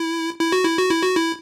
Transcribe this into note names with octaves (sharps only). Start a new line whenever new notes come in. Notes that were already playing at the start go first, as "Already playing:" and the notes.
Already playing: E4
E4
F#4
E4
F#4
E4
F#4
E4